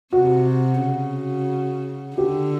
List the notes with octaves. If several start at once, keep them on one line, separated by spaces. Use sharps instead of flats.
C3 F#4
C#3
D3 G4